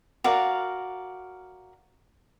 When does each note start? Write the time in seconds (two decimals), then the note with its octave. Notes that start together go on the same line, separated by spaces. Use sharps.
0.24 F#4 A#4 D5 F5